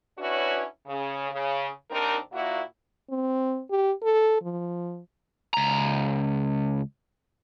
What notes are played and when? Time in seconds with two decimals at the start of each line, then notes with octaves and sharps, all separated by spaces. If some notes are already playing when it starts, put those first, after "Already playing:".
0.18 C#4 D4 E4 F#4 B4 C#5
0.87 C#3
1.32 C#3
1.91 D#2 C4 D4 D#4 A#4
2.33 A#2 A#3 E4 F#4
3.10 C4
3.71 G4
4.03 A4
4.42 F3
5.54 C#2 A#5